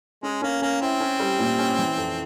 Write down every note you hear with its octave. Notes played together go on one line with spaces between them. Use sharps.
G#3 C#4
A#3 C#4
A#3 C#4
C4 E4
C#4
G3
A#2
C#4
E3
F2